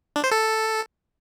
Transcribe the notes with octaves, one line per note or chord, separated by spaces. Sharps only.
D4
C5
A4